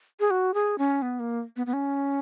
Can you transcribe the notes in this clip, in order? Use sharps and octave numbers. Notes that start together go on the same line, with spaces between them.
G#4
F#4
G#4
C#4
B3
A#3
B3
B3
C#4